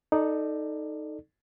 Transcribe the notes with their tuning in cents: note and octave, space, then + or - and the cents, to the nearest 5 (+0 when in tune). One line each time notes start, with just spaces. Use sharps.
D#4 +0 A4 +0 D5 +15